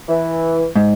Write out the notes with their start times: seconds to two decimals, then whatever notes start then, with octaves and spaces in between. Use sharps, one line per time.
0.09 E3
0.75 G#2